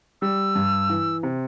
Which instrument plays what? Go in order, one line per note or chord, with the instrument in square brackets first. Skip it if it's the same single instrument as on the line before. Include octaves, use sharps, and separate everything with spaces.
[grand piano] G3 [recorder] E6
[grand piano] G2
E3
C3